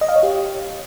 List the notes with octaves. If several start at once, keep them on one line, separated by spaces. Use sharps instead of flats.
D#5
F5
C#5
G4